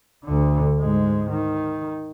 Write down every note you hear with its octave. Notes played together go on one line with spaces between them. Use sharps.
D2 D3
G#2 G#3
D#3